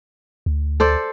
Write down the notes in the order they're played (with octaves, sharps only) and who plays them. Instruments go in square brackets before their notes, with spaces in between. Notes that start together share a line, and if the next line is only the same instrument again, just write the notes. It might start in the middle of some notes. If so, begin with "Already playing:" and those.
[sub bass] D2
[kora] A4 C5 D5